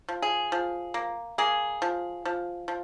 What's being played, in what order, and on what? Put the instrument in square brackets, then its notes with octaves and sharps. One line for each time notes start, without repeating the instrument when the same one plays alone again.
[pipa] F3
G#4
F3
A#3
A#3 G#4
F3
F3
F3